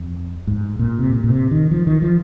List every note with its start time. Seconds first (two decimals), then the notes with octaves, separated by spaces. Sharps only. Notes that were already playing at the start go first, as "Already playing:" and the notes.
Already playing: F2
0.47 G#2
0.79 A#2
0.99 C3
1.10 A#2
1.24 A#2
1.30 C3
1.51 D#3
1.71 F3
1.87 D#3
2.02 F3